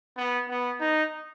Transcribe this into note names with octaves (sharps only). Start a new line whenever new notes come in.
B3
B3
D#4